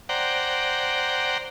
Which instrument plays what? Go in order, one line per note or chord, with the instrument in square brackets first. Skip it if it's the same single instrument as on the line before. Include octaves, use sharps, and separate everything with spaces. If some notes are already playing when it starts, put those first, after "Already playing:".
[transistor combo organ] C5 D5 F#5 G5 A#5